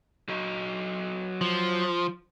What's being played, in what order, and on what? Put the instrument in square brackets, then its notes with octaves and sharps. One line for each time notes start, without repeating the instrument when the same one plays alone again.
[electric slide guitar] F#3 F#4 D#5
[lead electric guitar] F3